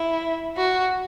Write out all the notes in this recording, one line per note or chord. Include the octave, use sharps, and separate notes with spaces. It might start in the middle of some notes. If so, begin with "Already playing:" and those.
Already playing: E4
F#4